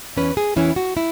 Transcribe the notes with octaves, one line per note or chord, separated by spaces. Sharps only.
E2 E3 C#4 B4
G#4
E2 E3 C#4 E4
F#4
E4